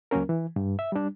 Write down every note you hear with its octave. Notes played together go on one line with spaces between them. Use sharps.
C#2 F#3 A#3 C#4 A#4
E3
G2
E5
G3 D4